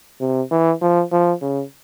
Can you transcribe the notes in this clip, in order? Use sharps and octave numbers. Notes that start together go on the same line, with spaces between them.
C3
E3
F3
F3
C#3